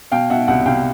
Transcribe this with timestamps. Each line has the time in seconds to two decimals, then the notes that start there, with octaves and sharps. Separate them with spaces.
0.12 B2 F5 G5
0.30 B2 E5 F#5
0.48 C2 E5 F#5
0.66 C2 F5 G5